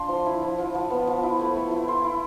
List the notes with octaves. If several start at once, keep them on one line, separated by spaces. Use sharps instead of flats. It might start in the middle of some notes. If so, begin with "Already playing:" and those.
Already playing: D4 F4 C6
F3
E4
F3
F3
F3
B3
F3
E4
A3
A3
E4
E4 C6
E4